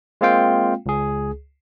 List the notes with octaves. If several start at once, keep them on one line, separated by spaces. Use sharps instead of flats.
G#3 A#3 C4 F4 F5 G5
C#2 G#4